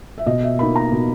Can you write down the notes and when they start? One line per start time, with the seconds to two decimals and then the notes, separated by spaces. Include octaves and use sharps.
0.18 E5
0.26 B2 D#5
0.43 E5
0.59 A#3 D#4 B5
0.76 A#5
0.92 B2